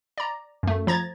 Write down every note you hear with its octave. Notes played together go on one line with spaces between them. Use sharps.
D5 A#5
F#2 A3
F3 A#5 G#6 A6